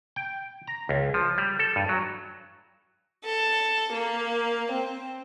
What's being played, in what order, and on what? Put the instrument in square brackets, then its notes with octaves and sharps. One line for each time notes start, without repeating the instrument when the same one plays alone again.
[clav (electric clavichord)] G5
A#5
C#2
F3
G3
A4
G2
F#3
[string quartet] A4
A#3
C4